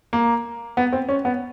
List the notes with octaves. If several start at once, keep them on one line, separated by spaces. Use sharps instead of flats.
A#3
B3
C4
C#4
B3